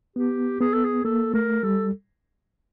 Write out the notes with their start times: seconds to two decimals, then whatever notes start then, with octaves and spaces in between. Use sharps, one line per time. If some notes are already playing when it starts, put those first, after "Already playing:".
0.16 B3 G4
0.60 B3 G#4
0.73 A4
0.84 G#4
1.04 A#3 A4
1.34 A3 A#4
1.63 G3 A4